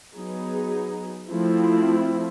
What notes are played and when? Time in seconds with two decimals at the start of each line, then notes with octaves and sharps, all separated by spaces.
0.15 F#3 B3 D#4 G#4
1.30 F3 A3 C4 E4